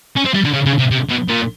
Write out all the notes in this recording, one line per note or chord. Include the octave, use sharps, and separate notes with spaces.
C#4
C4
G3
D3
C#3
C#3
C3
C3
B2
A#2